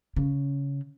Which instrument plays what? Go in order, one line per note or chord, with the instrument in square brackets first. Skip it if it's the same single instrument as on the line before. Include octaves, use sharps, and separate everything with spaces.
[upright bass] C#3